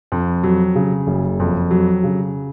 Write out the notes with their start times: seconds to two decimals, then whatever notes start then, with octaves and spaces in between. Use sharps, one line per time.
0.12 F2
0.43 F#3
0.75 C#3
1.07 F#1
1.40 F2
1.71 F#3
2.03 C#3